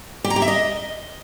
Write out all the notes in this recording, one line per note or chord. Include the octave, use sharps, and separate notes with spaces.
G4
A#5
G4
E5
D#5